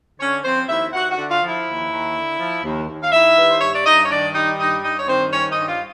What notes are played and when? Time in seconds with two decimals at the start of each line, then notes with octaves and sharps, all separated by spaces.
0.19 D3 C#4 C#5
0.44 F3 C4 C5
0.68 D#2 E4 E5
0.93 D#2 F#4 F#5
1.11 F#4 F#5
1.17 D3
1.30 F4 F5
1.42 F3
1.48 E4 E5
1.66 D#2
1.91 D#2
2.15 D3
2.39 F3
2.63 D#2
2.88 D#2
3.02 F5
3.12 D#3 E4 E5
3.36 G3 B4
3.49 C5
3.60 G2 C#5
3.73 D5
3.85 G2 D#4 D#5
4.04 C#5
4.10 D#3 D4 D5
4.34 G3 D#4 D#5
4.58 G2 D#4 D#5
4.83 G2 D#4 D#5
4.99 C#5
5.07 D#3 C4 C5
5.31 G3 C#4 C#5
5.50 D#4 D#5
5.56 G2
5.68 F4 F5